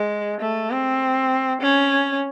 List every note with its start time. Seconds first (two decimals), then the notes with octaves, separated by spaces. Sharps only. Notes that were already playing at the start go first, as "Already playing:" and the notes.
Already playing: G#3
0.41 A3
0.71 C4
1.61 C#4